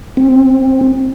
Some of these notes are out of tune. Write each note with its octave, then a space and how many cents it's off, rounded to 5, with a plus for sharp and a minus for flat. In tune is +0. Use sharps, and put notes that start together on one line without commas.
C4 +15